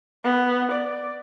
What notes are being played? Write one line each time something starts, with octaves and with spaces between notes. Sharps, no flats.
B3
D5